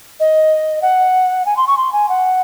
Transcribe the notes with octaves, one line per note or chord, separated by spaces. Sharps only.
D#5
F#5
G#5
C6
C#6
C6
G#5
F#5